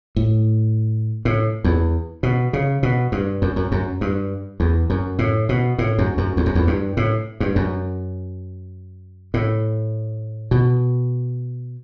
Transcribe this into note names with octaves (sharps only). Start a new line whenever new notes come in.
A2
A2
E2
B2
C#3
B2
G2
F#2
F#2
F#2
G2
E2
F#2
A2
B2
A2
F#2
F#2
E2
F#2
E2
G2
A2
G2
F#2
A2
B2